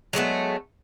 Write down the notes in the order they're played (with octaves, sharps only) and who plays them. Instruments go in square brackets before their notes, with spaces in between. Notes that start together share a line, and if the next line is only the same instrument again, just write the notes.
[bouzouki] F#3 G#3 A3 B3